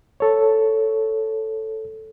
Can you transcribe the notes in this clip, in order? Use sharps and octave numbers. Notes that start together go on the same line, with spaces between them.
A4 C#5